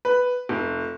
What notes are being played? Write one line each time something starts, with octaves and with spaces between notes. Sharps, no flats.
B4
F1